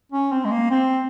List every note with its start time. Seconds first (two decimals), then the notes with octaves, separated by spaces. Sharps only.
0.12 C#4
0.32 C4
0.45 G#3
0.51 A#3
0.71 C4